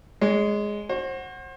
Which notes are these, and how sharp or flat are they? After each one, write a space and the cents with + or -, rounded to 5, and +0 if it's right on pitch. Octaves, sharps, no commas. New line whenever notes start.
G#3 +0 C#5 +35
F#4 +0 C5 +35